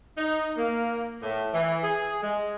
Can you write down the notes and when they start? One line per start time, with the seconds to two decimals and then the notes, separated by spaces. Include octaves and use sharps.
0.18 D#4
0.57 A#3
1.22 A2
1.54 E3
1.84 G#4
2.23 G#3